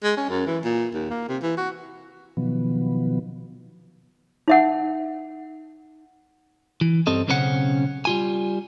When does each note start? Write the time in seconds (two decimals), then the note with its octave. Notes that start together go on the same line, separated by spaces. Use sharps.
0.04 G#3
0.17 C#4
0.29 F#2
0.46 E3
0.64 A#2
0.95 D#2
1.10 A#3
1.29 C3
1.42 E3
1.57 F#4
2.37 B2 D#3 F3 F#3 B3
4.48 D#4 E5 F#5
6.81 E3
7.07 G2 G3 C4 A4 D#5
7.28 B1 C#3 C4 C#4 A4 F#5
8.05 G3 F4 G#5